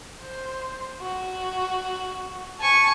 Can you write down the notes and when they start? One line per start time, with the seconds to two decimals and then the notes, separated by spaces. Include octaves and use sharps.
0.22 C5
1.02 F#4
2.60 G#5 A5 C#6